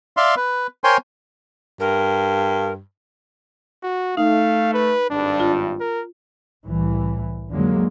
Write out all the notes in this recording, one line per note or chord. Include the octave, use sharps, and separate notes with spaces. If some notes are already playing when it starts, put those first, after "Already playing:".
D5 E5 F5 C6
B4
A#4 C5 C#5 G5 G#5 C6
G2 A#4
F#4
A3 D#4 F5
B4
G#1 G2 D4
F4
A#4
C2 A2 E3
F2 D3 F#3 G#3 A#3